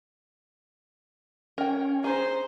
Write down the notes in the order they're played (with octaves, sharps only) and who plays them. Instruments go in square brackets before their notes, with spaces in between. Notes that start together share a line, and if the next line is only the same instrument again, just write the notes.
[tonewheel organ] C#4 [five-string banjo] A#4 G5
[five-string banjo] G#4 [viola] C5 [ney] A#5